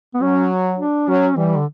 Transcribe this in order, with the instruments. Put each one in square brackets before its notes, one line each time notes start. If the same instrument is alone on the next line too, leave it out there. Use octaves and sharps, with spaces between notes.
[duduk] B3
[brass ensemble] F#3 [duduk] C#4
[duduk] D4
[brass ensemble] F#3 [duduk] C#4
[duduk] E3 [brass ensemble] G3
[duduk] D3